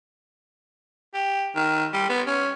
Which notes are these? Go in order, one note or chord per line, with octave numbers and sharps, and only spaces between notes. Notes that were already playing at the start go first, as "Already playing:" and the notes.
G4
D#3
G3
B3
C#4